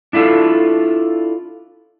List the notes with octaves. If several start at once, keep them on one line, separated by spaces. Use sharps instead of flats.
D4 E4 F4 A4